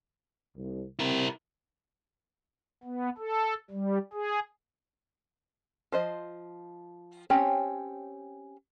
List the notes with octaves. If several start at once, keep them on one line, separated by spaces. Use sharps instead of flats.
C2
C3 C4 E4 A#4
B3
A4
G3
G#4
F3 C5 D#5
C4 C#4 G4 C#5